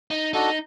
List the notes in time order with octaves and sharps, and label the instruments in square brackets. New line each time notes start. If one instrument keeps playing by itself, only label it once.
[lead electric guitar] D#4
[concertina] D4 F#4 A4 [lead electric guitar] D#4